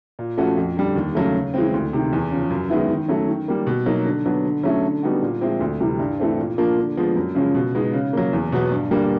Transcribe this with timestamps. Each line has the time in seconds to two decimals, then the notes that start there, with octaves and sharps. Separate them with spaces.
0.19 A#2
0.37 F3 A3 C#4 F#4
0.57 F2
0.77 D3 G3
0.96 D#2
1.15 C#3 F#3 A3
1.35 C#3
1.54 E3 G#3 C4
1.74 D2
1.93 C3 D#3
2.13 E2
2.31 C#3 F3
2.50 F#2
2.70 D#3 G#3 B3 E4
2.90 D#3
3.08 F#3 A3 C#4
3.28 D#3
3.48 G3 A#3
3.67 B2
3.86 F#3 A#3 D#4
4.06 D3
4.25 F#3 B3 D4
4.45 D3
4.63 F#3 A3 C#4 E4
4.83 D3
5.03 G3 B3 D#4 F#4
5.22 A#2
5.41 F3 G#3 C4 E4
5.60 D2
5.80 C3 E3 G3
5.99 G2
6.20 E3 A3 C4
6.38 A#2
6.58 F3 A#3 D4 F4
6.77 D3
6.97 F3 G#3 B3
7.15 F#2
7.35 C#3 F3 G#3 C#4
7.55 B2
7.75 G#3 B3 D#4
7.93 C#3
8.13 F#3 A#3
8.33 E2
8.52 B2 F#3 B3
8.71 G2
8.91 D3 G3 A#3